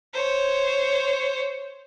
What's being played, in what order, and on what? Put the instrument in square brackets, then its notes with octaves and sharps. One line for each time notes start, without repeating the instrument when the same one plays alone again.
[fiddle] C5 C#5